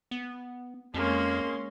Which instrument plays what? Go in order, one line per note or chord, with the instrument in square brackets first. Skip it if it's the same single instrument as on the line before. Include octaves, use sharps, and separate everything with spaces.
[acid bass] B3
[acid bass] F2 [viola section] G#3 C#4 C6 [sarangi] A#3